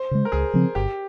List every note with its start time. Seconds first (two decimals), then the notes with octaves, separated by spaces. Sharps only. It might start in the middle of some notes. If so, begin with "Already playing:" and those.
Already playing: C5
0.11 C#3 G#3
0.25 A#4
0.32 C#2 G#4
0.54 C#3 F3 C4
0.75 G1 G4